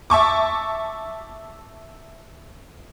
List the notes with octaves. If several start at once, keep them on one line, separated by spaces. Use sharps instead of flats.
E5 A5 C#6 D6